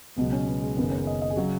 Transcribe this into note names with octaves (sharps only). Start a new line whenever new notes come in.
C#2 B2 F#3 B3
C#4
B3
G#3
F#1 F#2 D#3 B3
C#4
D#5
D#5
G#4
C#3 F#3 F#4